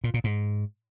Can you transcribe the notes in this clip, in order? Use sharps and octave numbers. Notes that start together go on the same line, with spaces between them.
A#2
A#2
G#2